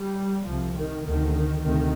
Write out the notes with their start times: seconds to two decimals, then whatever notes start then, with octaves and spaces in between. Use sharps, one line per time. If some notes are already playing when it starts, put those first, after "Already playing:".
Already playing: G3
0.48 C2 C3 F3
0.78 D#3
1.06 D2 C3 D#3
1.64 D2 C3 D#3